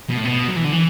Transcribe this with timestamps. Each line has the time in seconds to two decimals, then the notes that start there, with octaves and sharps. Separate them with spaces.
0.10 B2
0.17 A2
0.25 B2
0.48 F#3
0.56 E3
0.64 D3
0.72 E3